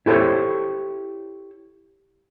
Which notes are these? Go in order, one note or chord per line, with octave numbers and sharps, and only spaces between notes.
E4 G4 A4 C5 C#5